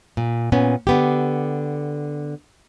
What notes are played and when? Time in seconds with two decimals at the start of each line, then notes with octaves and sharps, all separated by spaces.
0.17 A#2
0.52 A#2 B3 C#4
0.87 D3 B3 G4